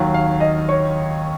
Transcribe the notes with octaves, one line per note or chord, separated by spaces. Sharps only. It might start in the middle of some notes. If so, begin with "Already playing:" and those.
Already playing: D#2 D#3 F#3 F5
F5
D#5
C#5